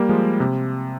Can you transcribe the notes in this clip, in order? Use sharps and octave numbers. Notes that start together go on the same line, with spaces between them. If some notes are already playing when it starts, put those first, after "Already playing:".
Already playing: G3 A#3
F3 G#3
C3